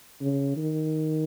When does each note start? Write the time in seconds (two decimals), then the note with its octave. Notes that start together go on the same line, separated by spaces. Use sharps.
0.21 C#3
0.56 D#3